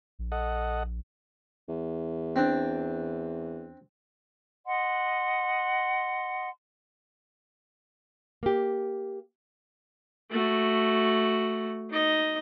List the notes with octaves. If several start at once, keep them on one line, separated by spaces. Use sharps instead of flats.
A#1
A4 D#5 F#5
E2
C4 D4
D#5 F#5 C6
A#3 G4
A3 F#4
D#4 D#5